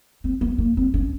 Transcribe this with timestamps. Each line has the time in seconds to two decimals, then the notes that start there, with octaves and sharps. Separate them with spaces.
0.24 C4
0.41 B3
0.58 A#3
0.77 C4
0.94 C#4